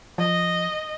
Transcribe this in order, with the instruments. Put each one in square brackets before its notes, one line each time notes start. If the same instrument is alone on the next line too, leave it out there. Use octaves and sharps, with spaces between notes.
[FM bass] F3 [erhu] D#5